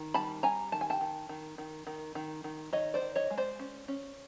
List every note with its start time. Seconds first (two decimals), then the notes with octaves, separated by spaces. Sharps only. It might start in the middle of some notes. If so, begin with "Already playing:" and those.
Already playing: D#3
0.14 G3 A5 B5
0.43 G3 G#5 A#5
0.72 D#3 A5
0.81 G#5
0.90 G5 A5
1.01 D#3
1.29 D#3
1.58 D#3
1.87 D#3
2.15 D#3
2.44 D#3
2.73 D#3 C#5 D#5
2.94 C5 D5
3.02 D#3
3.15 C#5 D#5
3.30 G#3
3.38 C5 D5
3.59 C#4
3.88 C#4